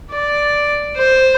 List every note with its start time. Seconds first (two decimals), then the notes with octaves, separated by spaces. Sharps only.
0.11 D5
0.96 C5